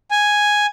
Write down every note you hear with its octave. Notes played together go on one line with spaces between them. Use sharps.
G#5